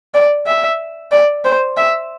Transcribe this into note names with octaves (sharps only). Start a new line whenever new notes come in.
D5
E5
D5
C5
E5